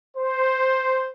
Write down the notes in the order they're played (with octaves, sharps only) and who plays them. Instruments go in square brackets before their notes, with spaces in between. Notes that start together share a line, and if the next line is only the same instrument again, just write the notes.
[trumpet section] C5